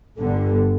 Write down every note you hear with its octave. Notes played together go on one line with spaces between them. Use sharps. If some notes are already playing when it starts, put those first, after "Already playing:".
G1 G2 D3